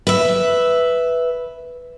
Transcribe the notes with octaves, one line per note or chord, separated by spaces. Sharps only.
B4 E5